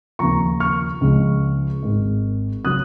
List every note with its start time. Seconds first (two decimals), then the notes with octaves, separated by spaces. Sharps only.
0.19 D#2 C#3 F3 A#5 C#6
0.60 C#6 F6
1.01 C#2 C#3 F3 G#3
1.82 G#1 G#2 D#3 G#3
2.65 C#3 F#3 D#6 F#6